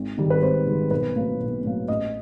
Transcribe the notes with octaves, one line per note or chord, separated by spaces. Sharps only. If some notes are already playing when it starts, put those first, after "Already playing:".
Already playing: G#1
G#2 D#3 G3
B4
G#1 C5
G#2 D#3 G3
B1 B4
A2 F#3 A#3
B1
A2 F#3 A#3
A1 D#5